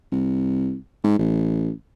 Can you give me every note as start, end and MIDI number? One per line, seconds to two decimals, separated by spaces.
0.12 0.76 36
1.04 1.18 44
1.19 1.71 33